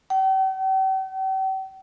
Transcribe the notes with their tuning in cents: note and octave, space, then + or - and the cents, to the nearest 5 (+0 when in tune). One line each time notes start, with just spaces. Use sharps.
G5 -45